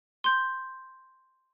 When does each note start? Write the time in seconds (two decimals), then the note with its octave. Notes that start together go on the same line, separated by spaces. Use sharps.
0.24 C6 G6